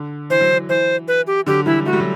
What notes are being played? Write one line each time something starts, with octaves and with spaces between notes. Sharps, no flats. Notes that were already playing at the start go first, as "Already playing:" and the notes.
Already playing: D3
E3 C5
F#3
E3
E3 C5
B4
G4
D3 F#3 G4
E3 G3 E4
A3 F#4
G3
F#3